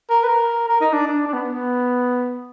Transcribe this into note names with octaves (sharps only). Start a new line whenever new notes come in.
A#4
B4
A#4
A#4
D#4
D4
D4
D4
B3
B3